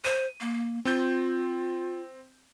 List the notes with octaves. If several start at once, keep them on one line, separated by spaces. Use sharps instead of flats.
C5 D#7
A#3
C4 F4 G6